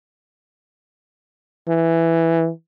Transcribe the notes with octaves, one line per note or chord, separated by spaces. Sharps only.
E3